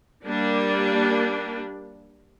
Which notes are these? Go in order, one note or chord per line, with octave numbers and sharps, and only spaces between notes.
G3 A#3 D4